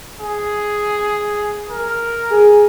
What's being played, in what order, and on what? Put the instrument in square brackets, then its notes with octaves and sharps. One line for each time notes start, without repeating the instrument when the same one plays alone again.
[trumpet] G#4
A#4
[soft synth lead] G#4